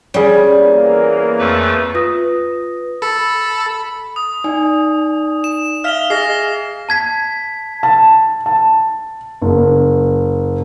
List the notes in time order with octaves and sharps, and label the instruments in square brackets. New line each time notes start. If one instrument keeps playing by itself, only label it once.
[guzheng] G3 [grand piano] C#4 G#4
[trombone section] E2 E3 A#3
[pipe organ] F2 A3 B4
[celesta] F4 B4 D#6 A#6
[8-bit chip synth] A4 [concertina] B5
[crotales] D#6
[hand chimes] D#4 D5 G#5
[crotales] E7
[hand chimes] E5 F5 B6 [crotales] F6 F7 G7
[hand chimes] G#4 D#5 G#5 [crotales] F6 A#6 C7
[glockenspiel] A5 G#6 B6
[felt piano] A5
A5
F#1